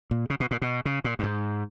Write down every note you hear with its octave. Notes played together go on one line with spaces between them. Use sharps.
A#2
C#3
B2
A#2
B2
C#3
A#2
G2
G#2